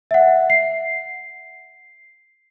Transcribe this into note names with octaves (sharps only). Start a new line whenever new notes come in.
E5 F#5
C7